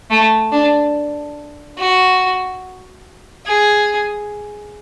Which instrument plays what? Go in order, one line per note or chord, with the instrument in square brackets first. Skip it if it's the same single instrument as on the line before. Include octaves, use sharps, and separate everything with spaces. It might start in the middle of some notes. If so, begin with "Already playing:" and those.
[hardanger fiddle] A3
D4
F#4
G#4